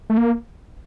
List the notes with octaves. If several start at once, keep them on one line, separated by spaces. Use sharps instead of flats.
A3
A#3